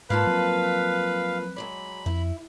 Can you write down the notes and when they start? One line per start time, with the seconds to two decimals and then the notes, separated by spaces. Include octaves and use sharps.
0.10 G#2 A#3 F4 B4 F5 A5
0.27 F3 F#3 C4
1.56 F#3 G#3 D5 B5
2.06 F2 E4